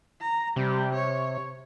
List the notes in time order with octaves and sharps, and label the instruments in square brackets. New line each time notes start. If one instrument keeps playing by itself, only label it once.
[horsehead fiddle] A#5
[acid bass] C3 [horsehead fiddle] G3
[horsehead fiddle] C#5